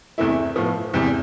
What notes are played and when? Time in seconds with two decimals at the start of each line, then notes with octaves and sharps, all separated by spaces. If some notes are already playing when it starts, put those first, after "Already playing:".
0.18 E2 C3 E3 A3 E4
0.56 A2 F3 B3
0.93 E2 C3 G3